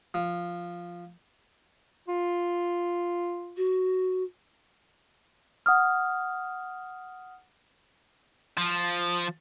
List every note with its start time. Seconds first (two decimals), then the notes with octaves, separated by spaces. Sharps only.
0.14 F3
2.08 F4
3.57 F#4
5.66 F#5 D#6 F6
8.58 F3